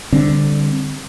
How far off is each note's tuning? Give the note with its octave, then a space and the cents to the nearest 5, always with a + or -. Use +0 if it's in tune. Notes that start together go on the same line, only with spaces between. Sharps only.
D3 +0 G3 +20 C4 +0